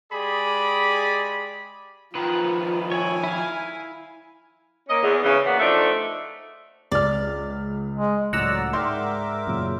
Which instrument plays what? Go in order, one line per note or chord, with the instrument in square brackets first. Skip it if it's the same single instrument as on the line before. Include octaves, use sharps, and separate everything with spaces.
[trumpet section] G#3 G4 G#4 D5 B5
[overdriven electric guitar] D#3 F3 [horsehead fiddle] F4 [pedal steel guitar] B4
[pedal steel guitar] E4 C#5 [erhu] G#5
[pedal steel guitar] E4 F5
[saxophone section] A#3 C#4 D#5
E2
C#3 E3
A#3 B3 F#4 D5
F3 A3 D4 D#4
[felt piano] C#2 F6 [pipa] D5
[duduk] G#3
[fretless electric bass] C#2 A2 [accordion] F#3 D5 [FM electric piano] F#5 A#5 E6
[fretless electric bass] G#2 [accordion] A#4 E5 D6 [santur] D5 G5 C6
[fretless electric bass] F#2 A#2 C#3